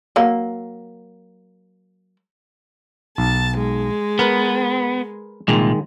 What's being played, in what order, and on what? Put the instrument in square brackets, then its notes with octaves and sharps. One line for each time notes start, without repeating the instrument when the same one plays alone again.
[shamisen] F#3 A#3
[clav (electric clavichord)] B1 [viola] A5
[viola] G#3
[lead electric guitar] B3 [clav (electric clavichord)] A#4 B4
[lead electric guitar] C2 A#2 [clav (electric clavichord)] D#3 G#3